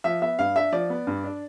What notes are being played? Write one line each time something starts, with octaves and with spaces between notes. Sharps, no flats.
F3 E5
B3 E5
G2 F5
D4 E5
F3 D5
B3
G2
D4